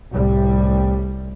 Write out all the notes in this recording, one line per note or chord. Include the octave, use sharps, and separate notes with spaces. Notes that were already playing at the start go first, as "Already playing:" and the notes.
C2 A2 G3